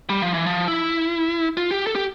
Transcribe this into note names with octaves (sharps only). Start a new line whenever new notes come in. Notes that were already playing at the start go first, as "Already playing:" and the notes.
G3
F3
E3
F3
E4
F4
G4
A4
G4